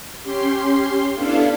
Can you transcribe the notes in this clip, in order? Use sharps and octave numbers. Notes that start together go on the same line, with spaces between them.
C#4 G4 C6
B3 D4 E4 A4 F5